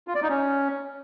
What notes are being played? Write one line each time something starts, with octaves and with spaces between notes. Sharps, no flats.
F4
D5
D#4
C#4